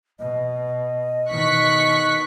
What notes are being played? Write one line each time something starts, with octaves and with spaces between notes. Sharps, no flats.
B2 D#5
B2 D#3 C#6 F#6 B6